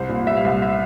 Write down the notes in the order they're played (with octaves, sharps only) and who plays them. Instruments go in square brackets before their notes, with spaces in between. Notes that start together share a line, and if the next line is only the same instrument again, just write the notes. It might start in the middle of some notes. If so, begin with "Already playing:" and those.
Already playing: [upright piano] C2 C5
A#2
G3 E5
F5
C2 E5
E5